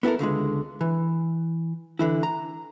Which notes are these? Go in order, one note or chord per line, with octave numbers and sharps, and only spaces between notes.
B3 E4 F#4 A4 A#4
C#2 D3 F3 G#3
E3
D3 E3 E4
A#5